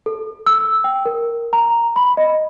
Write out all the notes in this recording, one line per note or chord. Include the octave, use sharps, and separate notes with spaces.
A4
E6
G5
A#4
A#5
B5
D#5